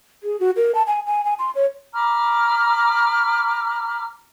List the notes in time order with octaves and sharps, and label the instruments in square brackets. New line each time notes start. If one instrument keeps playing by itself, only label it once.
[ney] G#4
F#4
A#4
A5
G#5
G#5
G#5
C6
C#5
[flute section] A#5 B5 D6 F6